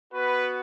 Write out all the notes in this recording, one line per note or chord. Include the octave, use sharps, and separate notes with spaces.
B3 F#4 B4